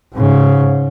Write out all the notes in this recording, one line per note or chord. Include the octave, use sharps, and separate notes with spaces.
G#2 C#3